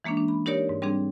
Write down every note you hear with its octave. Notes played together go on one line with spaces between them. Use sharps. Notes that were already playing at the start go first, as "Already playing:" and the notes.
E3 G#3 A#3 C#4 D4
D4
B5
D#4 G4 A#4 C#5 D5
G#2
G3 C4 D4 G#4